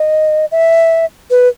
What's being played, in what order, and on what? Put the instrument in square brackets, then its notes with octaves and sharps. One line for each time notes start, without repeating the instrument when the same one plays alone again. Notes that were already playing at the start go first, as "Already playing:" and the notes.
Already playing: [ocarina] D#5
E5
B4